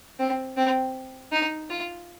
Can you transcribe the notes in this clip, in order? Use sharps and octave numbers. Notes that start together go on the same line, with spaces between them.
C4
C4
D#4
F4